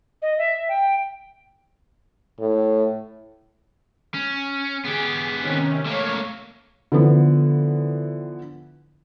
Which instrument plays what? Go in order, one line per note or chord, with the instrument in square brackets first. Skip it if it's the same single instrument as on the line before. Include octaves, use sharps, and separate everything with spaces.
[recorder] D#5
E5
G5
[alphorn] A2
[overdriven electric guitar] C#4
[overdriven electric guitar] B3 G4 [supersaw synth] G#4
[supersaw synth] C3 D#3 C#4
[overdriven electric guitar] A3 A#3 [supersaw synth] C#5
[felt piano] D3 E3 F3 B3